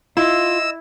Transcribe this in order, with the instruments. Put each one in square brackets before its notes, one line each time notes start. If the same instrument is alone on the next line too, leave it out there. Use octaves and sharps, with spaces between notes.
[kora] E4 [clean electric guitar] F4 [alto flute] D#5 [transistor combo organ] E6